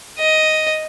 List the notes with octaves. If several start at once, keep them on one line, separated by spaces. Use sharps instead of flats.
D#5